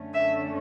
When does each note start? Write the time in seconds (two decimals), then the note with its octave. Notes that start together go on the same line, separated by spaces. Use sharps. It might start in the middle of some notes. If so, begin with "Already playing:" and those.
Already playing: F#2 D3 A3 C#4
0.14 E5